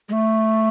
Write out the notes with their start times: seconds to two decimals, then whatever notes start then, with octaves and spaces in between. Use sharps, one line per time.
0.09 G#3
0.13 A3